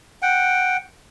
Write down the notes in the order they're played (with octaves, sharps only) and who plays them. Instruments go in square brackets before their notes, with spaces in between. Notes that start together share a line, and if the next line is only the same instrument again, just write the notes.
[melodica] F#5 G5